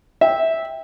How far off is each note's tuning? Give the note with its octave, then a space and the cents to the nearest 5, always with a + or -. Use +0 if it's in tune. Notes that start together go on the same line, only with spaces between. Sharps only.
E5 -15 G5 +10